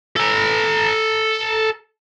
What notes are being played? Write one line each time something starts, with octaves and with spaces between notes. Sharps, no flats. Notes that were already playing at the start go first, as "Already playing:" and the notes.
A4 A#5